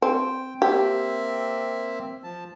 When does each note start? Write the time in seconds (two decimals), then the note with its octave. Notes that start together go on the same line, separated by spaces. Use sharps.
0.02 C4 G5
0.62 A#3 C4 G4 E5
2.23 F3 A5